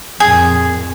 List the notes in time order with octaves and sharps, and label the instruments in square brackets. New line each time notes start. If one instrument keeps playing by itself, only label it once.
[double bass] F2 A#2 [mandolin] G#4